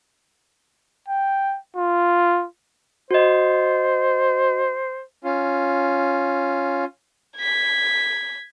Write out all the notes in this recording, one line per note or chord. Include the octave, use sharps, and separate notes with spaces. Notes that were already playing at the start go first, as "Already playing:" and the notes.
G5
F4
F#4 C5 D#5
C#4 F4
G#6 B6